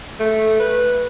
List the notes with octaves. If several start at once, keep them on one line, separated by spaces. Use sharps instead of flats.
A3
B4